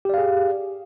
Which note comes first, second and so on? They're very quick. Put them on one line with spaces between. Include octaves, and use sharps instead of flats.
G4 D5 F5 G#4